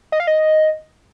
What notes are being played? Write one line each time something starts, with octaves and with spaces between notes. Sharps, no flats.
D#5
F5
D#5